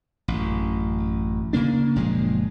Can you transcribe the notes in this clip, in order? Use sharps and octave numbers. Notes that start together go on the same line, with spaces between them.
A1 F#2
C#3 A#3 D4
F#1 A#2 F3 G#3